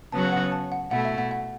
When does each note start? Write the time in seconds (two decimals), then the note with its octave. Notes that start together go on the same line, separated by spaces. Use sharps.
0.12 C#3 F#3 B3 F#4 C#5 A5
0.32 F#5
0.52 A5
0.72 F#5
0.91 B2 A3 E4 F#5
1.05 E5
1.18 F#5
1.31 F#5